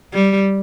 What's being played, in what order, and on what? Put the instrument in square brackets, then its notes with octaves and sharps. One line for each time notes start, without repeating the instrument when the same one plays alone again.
[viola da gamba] G3